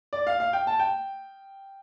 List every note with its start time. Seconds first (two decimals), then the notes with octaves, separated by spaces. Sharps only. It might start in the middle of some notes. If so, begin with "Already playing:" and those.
0.13 D5
0.27 F5
0.40 F5
0.53 G5
0.67 A5
0.79 G5